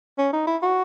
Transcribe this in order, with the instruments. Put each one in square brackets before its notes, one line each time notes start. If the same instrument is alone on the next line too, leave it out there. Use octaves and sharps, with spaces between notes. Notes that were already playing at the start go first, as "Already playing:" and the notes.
[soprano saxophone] C#4
D#4
E4
F#4